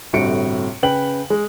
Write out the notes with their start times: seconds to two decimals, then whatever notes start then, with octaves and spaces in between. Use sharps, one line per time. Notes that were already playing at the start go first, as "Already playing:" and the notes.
0.13 G1 A2 C3 F#4 C#7 D7
0.83 C#3 B4 G5 F#7
1.30 G#3